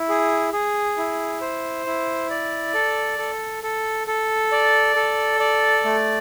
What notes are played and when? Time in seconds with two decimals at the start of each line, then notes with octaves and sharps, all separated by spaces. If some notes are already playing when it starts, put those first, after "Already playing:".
Already playing: E4
0.09 G#4
0.52 G#4
0.98 E4
1.41 C5
1.86 E4
2.30 D5
2.74 A4
3.19 A4
3.63 A4
4.07 A4
4.52 D5
4.96 A4
5.40 D5
5.84 A3